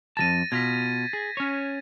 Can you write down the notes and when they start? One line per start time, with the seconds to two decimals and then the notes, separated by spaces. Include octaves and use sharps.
0.17 F2 F3 A5 A6 A#6 D#7
0.52 B2 F4 G#6 A#6 B6
1.13 G#4
1.37 C#4 C#5